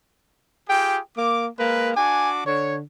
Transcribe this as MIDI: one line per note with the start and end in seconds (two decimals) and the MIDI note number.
0.69 0.99 65
0.69 0.99 67
0.69 0.99 68
0.69 0.99 79
1.17 1.48 58
1.17 1.47 86
1.59 1.90 56
1.59 1.92 58
1.59 1.90 70
1.59 1.90 71
1.96 2.46 62
1.96 2.46 66
1.96 2.29 80
1.96 2.46 86
2.46 2.81 50
2.46 2.76 73